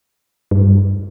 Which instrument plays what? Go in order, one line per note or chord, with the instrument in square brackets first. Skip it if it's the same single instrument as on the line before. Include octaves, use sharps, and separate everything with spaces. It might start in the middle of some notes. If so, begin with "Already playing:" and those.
[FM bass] G2